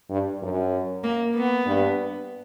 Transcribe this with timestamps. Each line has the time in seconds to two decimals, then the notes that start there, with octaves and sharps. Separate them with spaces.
0.10 G2
0.42 F#2
1.04 A#3
1.35 B3
1.66 G2